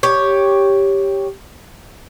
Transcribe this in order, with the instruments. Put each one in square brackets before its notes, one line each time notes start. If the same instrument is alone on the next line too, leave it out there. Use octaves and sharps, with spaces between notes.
[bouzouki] G4 C#5